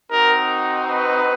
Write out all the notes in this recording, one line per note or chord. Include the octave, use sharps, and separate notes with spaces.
C4 D#4 F#4 A#4
B4